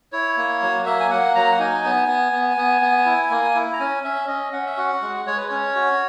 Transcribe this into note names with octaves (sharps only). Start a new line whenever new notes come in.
E4 C#5
A#3
F#3
A#3 E5
G#5
A#3 F#5
F#3 A#5
F#5
D#4 G#5
B3
B3
B3
B3
B3
E4
A#3
E4
A#5
C#4 G#5
C#4 E5
C#4 D#5
C#4 F#5
E5
F#4 F#5
G#3
G#3 C#5
B4
C#4 C#5
F#4